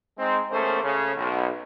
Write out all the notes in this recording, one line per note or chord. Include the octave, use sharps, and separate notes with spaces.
G#3 C4 D#4
E2 A3 A#3 C#4 G#4 C5
C#3 A3
B1